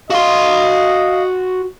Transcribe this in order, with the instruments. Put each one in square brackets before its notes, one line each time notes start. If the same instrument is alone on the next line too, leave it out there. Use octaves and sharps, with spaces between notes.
[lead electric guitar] F#4 C6 [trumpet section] D#5 [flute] F5